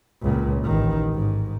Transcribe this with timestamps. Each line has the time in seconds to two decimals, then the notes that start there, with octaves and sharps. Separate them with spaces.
0.22 C#2 A#2
0.64 A1 D#3
1.14 G#2